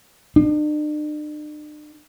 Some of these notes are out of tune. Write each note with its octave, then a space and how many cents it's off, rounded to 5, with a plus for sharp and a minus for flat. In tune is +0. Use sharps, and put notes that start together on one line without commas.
D4 +45